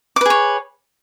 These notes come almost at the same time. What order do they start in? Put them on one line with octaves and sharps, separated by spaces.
D6 B4 G#4 C#5